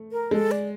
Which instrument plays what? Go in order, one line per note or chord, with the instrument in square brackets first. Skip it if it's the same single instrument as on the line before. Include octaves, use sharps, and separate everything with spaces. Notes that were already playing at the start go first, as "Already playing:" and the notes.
Already playing: [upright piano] A3
[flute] A#4
[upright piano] G#3 [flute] A4
[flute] D5